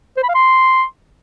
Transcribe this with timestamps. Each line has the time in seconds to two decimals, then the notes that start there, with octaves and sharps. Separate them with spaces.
0.17 C5
0.23 B5
0.29 F5
0.35 C6